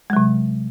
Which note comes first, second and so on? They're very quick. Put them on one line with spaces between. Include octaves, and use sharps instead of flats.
G#3 F#3 C3